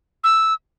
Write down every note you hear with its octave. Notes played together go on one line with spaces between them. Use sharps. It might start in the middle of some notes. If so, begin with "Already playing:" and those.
E6